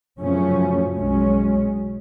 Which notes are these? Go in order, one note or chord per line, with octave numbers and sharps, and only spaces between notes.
F#2 C#3 F3 A3 C#4
B1 B2 G#3 C#4